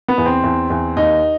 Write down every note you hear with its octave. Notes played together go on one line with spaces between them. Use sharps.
B3
E2
C4
E2
E2
D#2 D#4